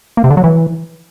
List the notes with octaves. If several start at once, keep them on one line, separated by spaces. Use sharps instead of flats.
A#3
C3
D3
F#3
E3